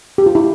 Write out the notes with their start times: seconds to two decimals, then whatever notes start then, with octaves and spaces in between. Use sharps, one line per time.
0.18 G4
0.26 F4
0.35 E4